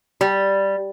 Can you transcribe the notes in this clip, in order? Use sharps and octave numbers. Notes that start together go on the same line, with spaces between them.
G3